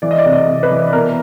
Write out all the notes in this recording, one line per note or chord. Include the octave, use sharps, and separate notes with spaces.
E3 D5
D#5
D5
C3
D#5
C3
B4
E3
B2 A#4